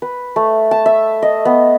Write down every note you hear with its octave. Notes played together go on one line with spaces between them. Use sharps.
B4
A3
A5
E5
D#5
B3